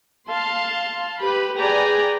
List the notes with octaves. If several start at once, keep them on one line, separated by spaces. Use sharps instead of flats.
F5 A5 C6
G4 B4 B5
G#4 B4 D5 G5 G#5 A#5